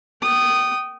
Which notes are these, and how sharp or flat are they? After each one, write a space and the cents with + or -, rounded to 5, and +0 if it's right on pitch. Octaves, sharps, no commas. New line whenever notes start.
G5 -30 D#6 -10